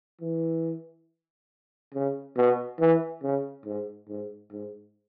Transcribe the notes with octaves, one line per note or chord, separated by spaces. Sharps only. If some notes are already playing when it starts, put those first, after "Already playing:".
E3
C#3
B2
E3
C#3
G#2
G#2
G#2